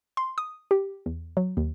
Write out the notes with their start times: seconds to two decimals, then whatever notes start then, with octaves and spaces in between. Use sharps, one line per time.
0.17 C6
0.38 D#6
0.71 G4
1.06 E2
1.37 F#3
1.57 D#2